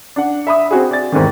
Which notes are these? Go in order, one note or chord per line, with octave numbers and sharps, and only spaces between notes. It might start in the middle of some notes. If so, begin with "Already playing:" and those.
D4 F#5
E5 B5 D#6
C4 F#4 G#4
D5 A6
E2 G#2 C3 D#3